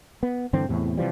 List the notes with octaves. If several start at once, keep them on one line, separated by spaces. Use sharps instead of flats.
B3
G2 D3 E3 C4
E2 A2 C3
C3 E3 F3 G3